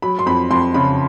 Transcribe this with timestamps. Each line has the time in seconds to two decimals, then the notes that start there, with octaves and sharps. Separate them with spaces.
0.02 F#3 B5
0.19 C6
0.26 F2 B5
0.51 F2 C6
0.74 C#3 B5